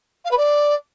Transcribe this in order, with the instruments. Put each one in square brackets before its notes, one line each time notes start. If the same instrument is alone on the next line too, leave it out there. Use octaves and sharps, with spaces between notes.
[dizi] F5
B4
D5